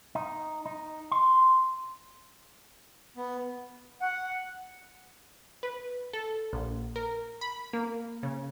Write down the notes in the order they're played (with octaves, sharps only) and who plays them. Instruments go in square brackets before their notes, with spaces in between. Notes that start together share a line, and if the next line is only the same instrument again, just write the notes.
[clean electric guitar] D#4
D#4
C6
[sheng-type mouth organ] B3
[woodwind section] F#5
[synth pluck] B4
A4
A#1
A#4
B5
A#3
C#3